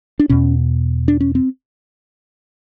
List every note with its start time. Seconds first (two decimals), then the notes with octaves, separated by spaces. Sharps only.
0.19 D4
0.29 E2 B2 C#4
1.08 D4
1.21 C#4
1.35 C4